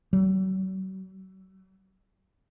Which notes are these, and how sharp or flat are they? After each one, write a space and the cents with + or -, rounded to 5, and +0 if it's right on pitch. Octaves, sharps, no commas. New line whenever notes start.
F#3 +40